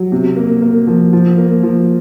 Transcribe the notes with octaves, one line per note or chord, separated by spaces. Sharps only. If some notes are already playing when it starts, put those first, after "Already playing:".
Already playing: F#3
C3
A#3
A#3
F3
F3
A#3
F3